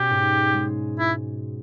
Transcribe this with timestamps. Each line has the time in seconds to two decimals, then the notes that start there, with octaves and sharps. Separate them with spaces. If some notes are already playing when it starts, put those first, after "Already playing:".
Already playing: B2 C#4 G4
0.10 G#2
0.54 G#3
0.99 E4